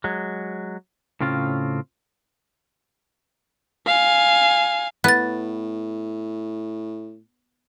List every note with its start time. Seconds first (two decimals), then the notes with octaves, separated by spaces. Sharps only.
0.04 F#3 G#3
1.21 A2 C#3 C4 C#4 F4
3.87 F5 G#5
5.04 A2 B3 F#6 A6